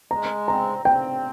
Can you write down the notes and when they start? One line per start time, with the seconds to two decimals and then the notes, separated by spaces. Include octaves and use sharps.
0.11 G#3 A#5
0.48 C4 A#5
0.85 C4 G5